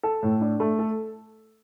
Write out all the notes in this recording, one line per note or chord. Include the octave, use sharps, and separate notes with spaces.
A4
A2
D4
A3
A4